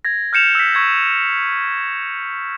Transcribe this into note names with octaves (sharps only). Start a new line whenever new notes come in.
G#6 A#6
F6 G6 C#7 E7 F7
E6 B6
C#6 G#6